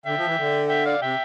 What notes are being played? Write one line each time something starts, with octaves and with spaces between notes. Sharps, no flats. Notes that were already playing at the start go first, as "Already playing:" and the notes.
D3 E5 G5
F3
E3
D3
E5 G5
D5 F5
C3 E5 G5